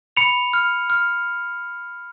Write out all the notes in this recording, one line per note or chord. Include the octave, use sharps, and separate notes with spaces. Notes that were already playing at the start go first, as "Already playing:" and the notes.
B5 C#7 F7
F6
F6